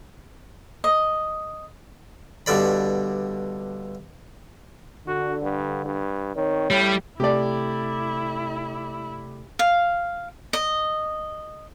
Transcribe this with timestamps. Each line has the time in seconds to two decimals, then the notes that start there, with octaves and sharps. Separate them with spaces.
0.84 D#5
2.46 G2 B2 D3 D5 B5
5.07 D3 F#4
5.42 G2
5.84 G2
6.36 D#3 C4 C#5
6.70 A2 G3
7.20 C3 A3 E4 G4 A4 D5
9.59 F5
10.53 D#5